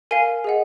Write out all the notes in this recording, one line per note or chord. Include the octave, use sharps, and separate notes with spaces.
A#4 F5 G#5
G#4 D#5 F#5